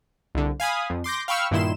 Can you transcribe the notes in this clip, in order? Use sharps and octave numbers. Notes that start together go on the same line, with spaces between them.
C2 D3
F5 G#5 B5 D#6
F2
C6 D6 G6 A#6
F5 G5 B5 C#6 E6 F6
G2 A#2 D#3 E4 C6 E7